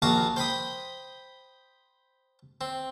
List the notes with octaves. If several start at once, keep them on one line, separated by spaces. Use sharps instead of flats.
A#1 F#4 F5 A5 A#5 D6
C5 G5 B5 D#6
C4